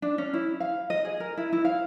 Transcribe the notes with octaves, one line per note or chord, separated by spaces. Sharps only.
D4
C#4
E4
F5
D#5
G#4
A#4
E4
E4
F5